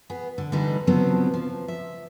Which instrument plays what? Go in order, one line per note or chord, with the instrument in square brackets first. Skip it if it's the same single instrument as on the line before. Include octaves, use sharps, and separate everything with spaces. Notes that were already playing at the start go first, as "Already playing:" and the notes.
[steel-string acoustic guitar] B3 G#4
D3
D3 E3 G3 D#4 B4
C#3 F3 F#3 B3 C4 D4
F3
E5